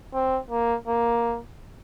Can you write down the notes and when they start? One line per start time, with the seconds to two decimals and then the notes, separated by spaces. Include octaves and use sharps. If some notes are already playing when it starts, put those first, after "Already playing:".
0.14 C4
0.50 A#3
0.87 A#3